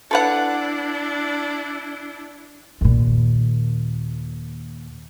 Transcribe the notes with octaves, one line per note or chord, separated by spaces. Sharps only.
D4 E4 A4 B4 F#5
D#2 A#2